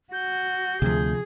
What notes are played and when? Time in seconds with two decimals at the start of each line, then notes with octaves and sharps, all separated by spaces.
0.13 F#4 G6
0.82 D2 C3 F3 G#4